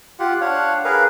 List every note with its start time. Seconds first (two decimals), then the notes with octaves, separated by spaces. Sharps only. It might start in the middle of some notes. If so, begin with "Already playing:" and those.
0.19 F4 G4 F#5
0.41 D4 C#5 F5 F#5
0.85 G#4 A#4 B4 F5